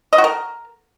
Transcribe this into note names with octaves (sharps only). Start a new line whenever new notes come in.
D#5
F#4
A#4